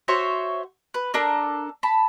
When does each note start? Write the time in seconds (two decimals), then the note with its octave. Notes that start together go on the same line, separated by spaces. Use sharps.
0.08 F#4 C5 C#5 E5
0.94 B4
1.14 D4 A4 A#4
1.83 A5 B5